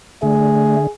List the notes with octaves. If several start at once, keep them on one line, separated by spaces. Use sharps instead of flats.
D3 A3 G#4